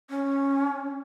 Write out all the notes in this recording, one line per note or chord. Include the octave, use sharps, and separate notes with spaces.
C#4